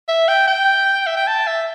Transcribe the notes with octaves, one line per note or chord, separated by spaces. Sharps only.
E5
G5
G5
E5
G5
A5
E5